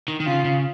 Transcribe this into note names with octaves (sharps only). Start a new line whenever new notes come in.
D#3
D#3
C#3 F4
C#3